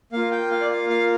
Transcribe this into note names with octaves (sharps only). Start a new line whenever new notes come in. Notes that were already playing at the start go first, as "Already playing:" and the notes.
A#3 F4 F5
G5
F5
D5
F5
F5